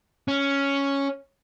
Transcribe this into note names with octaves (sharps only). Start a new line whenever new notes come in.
C#4